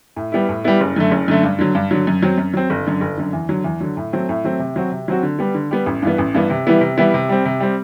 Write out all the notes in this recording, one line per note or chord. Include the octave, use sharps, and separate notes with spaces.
A2
G3 B3 E4
A2
G3 B3 E4
F#1
F#2 D3 A3
F#1
F#2 D3 A3
G2
D3 F#3
G2
D3 F#3
F#2
F#3 C4
F#2
F#3 C4
G1
F#2 D3
G1
F#2 D3
E2
D3 F#3
E2
D3 F#3
A2
F#3 A3 C4
A2
F#3 A3 C4
C3
F#3 C4 F#4
C3
F#3 C4 F#4
D3
G3 B3
D3
G3 B3
A1
G2 E3 B3
A1
G2 E3 B3
C3
E3 G3 B3 E4
C3
E3 G3 B3 E4
C3
G3 C4
C3
G3 C4